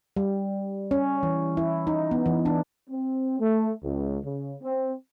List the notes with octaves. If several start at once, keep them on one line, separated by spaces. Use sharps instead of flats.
G3
C#4
E3
E4
D#4
B3
E3
D4
C4
A3
C#2
C#3
C4